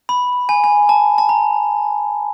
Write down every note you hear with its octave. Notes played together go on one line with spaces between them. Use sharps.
B5
G#5
G#5
A5
A5
A#5